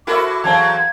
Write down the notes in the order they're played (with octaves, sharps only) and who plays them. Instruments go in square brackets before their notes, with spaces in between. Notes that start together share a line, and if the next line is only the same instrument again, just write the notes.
[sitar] E4 F#4 A4 [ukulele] A#4 C5 E5 [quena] D6
[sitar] E2 F#3 C4 [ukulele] F5 A5 A#5 [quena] G#6